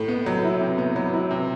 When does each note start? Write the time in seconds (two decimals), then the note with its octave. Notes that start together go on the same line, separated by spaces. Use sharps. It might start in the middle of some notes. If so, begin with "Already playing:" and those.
Already playing: A2
0.08 B3
0.26 F#3
0.43 E4
0.61 C3
0.78 B3
0.96 F#3
1.13 E4
1.31 C3